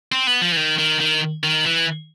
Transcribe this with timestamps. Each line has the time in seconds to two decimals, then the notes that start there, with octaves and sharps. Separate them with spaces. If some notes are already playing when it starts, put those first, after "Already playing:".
0.12 C4
0.27 B3
0.42 F3
0.52 E3
0.57 D#3
0.78 D#3
1.00 D#3
1.43 D#3
1.66 E3